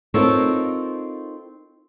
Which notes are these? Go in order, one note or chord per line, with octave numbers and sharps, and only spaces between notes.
C4 D#4 F4 A4 A#4 C#5